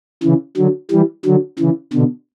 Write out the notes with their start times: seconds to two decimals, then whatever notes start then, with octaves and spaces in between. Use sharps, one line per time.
0.23 C#3 E3
0.57 D3 F#3
0.91 E3 G3
1.25 D3 F#3
1.59 C#3 E3
1.93 B2 D3